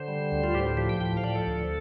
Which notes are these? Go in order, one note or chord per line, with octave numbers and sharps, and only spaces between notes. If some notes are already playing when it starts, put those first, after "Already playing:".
Already playing: D3 C5
G3
D2
F4
A2 G4
F3 G4
G5
A2 G5
F5
F3 D5
A4
D2